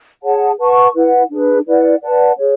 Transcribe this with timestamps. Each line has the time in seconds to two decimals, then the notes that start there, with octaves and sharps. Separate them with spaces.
0.23 G#4 C#5 F#5 A5
0.58 B4 F#5 A5 C#6
0.95 E4 B4 F#5
1.31 D4 G#4 B4
1.67 E4 B4 D5 F#5
2.03 B4 D5 F#5 A5
2.38 G#4 C#5